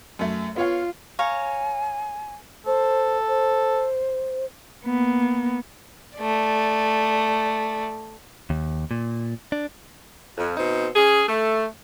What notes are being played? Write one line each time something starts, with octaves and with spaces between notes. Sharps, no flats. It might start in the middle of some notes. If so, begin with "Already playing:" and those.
F#2 A3
B3 F4 C#5 F5
C#5 F5 G#5 A#5
A4 C5
C5
A#3 B3
A3 D5
D#2
A#2
D4
F2
B2 C4 D#4
C#4 G#4
A3